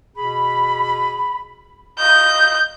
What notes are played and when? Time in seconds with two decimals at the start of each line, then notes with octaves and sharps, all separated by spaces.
0.16 B2 G#4 B5
1.99 D#5 F5 D#6 G6